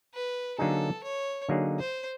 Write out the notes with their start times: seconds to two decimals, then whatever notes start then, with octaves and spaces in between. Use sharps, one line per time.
0.15 B4
0.58 D3 F#3 A#3 D#4 G#4 A4
1.04 C#5
1.49 D3 F#3 A#3 D#4 G#4
1.79 C5